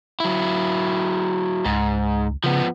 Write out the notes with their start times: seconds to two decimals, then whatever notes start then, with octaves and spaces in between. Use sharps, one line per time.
0.20 F#3 E4
1.66 C#2 G#2
2.44 C#3 F3 B3